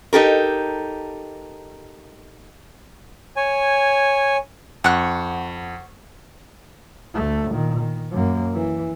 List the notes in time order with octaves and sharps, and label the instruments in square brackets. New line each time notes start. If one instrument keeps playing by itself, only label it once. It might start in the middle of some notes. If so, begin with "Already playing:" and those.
[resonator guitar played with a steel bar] D#4 G4 A4 A#4
[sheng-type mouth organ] C#5 G#5
[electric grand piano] F2 [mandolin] F#5 C#6 F#6
[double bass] D2 A3
A#2 D#3
D#3
F#2 A#3
E3